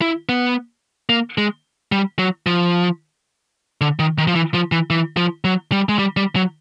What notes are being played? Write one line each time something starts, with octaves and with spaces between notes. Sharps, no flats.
E4
B3
A#3
G#3
G3
F#3
F3
D3
D#3
D#3
F3
E3
F3
E3
E3
F3
F#3
G3
G#3
G3
G3
F#3